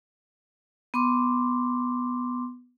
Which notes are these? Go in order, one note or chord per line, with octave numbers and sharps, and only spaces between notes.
B3 C6 D6